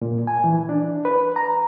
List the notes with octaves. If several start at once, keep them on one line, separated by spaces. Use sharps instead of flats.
A#2
G#5
E3
D4
B4
A#5